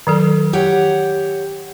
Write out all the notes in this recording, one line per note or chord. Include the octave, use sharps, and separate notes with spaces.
D#3 F#3 A4
G4 C#5 F#5